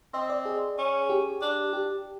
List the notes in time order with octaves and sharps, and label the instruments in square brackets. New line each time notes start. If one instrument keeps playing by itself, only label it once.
[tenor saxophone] C4 [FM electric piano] D#5
[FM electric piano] D5
G#4
[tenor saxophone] C#4
[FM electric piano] G4
[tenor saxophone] D4
[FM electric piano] G4